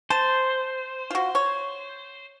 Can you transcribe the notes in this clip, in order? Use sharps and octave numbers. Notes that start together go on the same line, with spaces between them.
C5 A5
F4 F#4
C#5